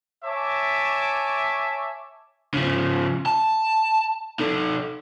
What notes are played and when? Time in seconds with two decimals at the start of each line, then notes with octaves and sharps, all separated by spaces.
0.23 C#5 E5 G#5 A5 D6
2.54 C#3 F3
3.26 A5
4.39 D#4 A4